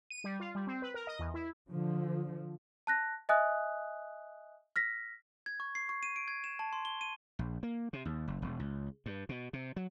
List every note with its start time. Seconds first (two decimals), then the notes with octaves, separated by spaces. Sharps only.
0.10 D#7
0.24 G3
0.40 F4
0.55 G3
0.67 C4
0.82 B4
0.94 A#4
1.07 D#5
1.19 E2
1.34 E4
1.70 D3 F3
2.87 A5 F#6 A#6
3.29 D#5 E5 G#5 D#6 F#6
4.76 F6 A#6 B6
5.46 G#6
5.60 C#6
5.75 C7
5.89 C#6
6.03 D#7
6.16 D7
6.28 G#6
6.44 E7
6.59 A5
6.73 C6
6.85 G7
7.01 D#7
7.39 A#1
7.63 A#3
7.93 C3
8.05 D#2
8.28 F#1
8.42 E1
8.59 C#2
9.06 G2
9.29 B2
9.53 C3
9.76 F#3